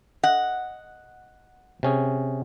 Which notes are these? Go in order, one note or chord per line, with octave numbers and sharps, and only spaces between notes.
D#5 F#5
C3 C#4 G#4